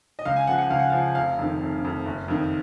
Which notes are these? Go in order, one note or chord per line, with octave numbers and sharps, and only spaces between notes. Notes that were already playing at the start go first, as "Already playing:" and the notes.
D#5
C#2 F5
G#5
C#3 F3 F#5
F#5
C#2 F5
F#5
C#3 F3 F5
F1 F5
F2 D#3
F1
F2 D#3
F#1
F2 D#3